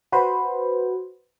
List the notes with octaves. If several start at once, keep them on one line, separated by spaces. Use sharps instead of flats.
F#4 B4 C5